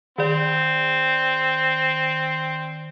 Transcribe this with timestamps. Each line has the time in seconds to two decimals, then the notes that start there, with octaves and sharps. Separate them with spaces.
0.18 D#3 C4 D5